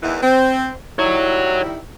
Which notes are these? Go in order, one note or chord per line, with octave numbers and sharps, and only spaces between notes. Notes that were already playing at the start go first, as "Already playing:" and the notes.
E2 D#3 E3
C4
D#3 G3 E4 F#4 C#5